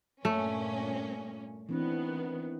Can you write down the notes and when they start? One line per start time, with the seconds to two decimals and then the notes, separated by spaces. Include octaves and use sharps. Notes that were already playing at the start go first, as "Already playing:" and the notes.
0.25 G2 A#2 A3 C#4
1.69 D#3 E3 B3 C4 D4